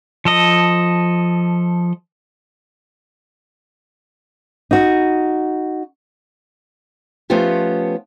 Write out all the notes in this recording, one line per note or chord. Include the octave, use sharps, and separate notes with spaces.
F3 A4 D#5
D#4 F#4
F3 A3 B3 C#4 F4 G4